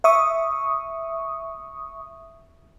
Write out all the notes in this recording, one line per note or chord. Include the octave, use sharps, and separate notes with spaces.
E5 C#6 D#6